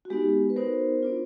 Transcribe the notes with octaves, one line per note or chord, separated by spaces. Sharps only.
F#4
G#3 B3 D#4 G4
B4
B3 D#4 F#4 A#4 C5
B3 D4 F4